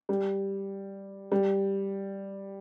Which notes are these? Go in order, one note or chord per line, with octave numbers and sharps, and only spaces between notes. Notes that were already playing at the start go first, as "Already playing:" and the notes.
G3
G3